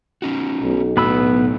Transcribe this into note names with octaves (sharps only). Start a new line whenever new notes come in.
C#4 D#4 F#4
B1
A2 F#3 B3 B5 E6